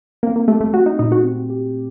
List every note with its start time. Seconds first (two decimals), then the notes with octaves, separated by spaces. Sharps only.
0.23 A#3 C4
0.36 A#3
0.48 A3 G4
0.60 A3
0.73 A3 F#4
0.86 D#4
0.99 A#2 D#4
1.12 F#4
1.24 C4
1.50 G4